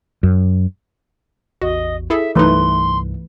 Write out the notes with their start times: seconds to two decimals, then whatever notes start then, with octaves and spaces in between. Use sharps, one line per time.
0.23 F#2
1.62 A1 E2 F#4 D#5
2.10 E4 G#4 A4 E5
2.35 C2 G2 E3 F#3 A3 D#4 B4 C6